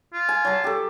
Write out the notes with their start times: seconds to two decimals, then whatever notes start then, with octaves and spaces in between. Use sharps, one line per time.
0.13 F4
0.29 G#5
0.45 F#3 A5
0.64 G4 A4